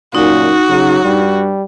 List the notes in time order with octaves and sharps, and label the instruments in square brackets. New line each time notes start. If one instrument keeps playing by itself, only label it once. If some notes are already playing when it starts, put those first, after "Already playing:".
[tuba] F#2 [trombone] A#2 [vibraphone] D#4 [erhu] F#4
[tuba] C#3 [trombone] F#3
[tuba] G2 [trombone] G3